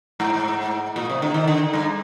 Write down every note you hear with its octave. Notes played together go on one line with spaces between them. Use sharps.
G#2
A#2
C3
D3
D#3
D3
G2